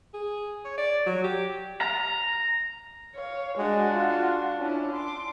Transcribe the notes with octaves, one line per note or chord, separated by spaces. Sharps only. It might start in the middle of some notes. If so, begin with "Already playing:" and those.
G#4
C#5
D5
F#3
G4
A#5
C#5 F5
G#3 D4 F#4
F4
C#4 D4 E4
C6 D6